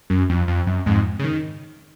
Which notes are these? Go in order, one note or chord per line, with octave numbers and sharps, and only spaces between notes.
F#2
F2
F2
F#2
F2 G#2
C#3
D#3